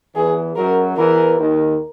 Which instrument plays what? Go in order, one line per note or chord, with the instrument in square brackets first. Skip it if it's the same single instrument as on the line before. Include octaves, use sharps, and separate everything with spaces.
[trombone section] E2 E3 [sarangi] G#4
[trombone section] F#2 F#3 [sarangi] A#4
[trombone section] E2 E3 [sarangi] A#4
[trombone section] D#2 D#3